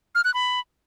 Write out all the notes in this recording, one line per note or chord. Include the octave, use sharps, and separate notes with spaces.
F6
F#6
B5